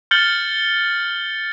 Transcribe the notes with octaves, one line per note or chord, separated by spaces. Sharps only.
F6 G6 A6 C#7 F#7 G7